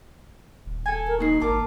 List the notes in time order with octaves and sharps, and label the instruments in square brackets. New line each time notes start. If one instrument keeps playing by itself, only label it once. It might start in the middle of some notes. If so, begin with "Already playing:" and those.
[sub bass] D#1
[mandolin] A4 G#5
[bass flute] A#4
[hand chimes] A#3 C7 [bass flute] D#4 [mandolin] F#4
[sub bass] G#1 [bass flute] A#4 [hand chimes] A5 [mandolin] D6